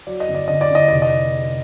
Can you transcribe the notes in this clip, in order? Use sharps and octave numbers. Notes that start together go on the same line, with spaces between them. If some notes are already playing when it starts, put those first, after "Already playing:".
F#3 D5
D#5
G1
D5
D3 D#5
D5
D3 D#5
F1 D5
D#5